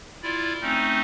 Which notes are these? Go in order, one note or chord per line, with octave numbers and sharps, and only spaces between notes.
E4 F4 D5
A3 C4 C#4 D#4